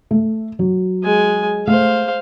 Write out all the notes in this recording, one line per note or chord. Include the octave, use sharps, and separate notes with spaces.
A3
F#3
G#3 G#5
A3 C5 F5